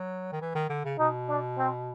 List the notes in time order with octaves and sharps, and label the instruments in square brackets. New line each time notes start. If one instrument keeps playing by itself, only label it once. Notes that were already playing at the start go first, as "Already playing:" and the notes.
Already playing: [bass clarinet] F#3
D#3
E3
D#3
D3
C#3
[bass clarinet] B2 [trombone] D#4
[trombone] D4
C4